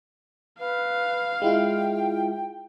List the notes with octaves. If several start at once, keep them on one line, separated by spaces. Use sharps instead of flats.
B4 F5
G#3 E4 F4 G5